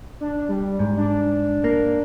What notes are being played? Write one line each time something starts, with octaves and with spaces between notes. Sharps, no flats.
D4
G3
G#2
D4
A#3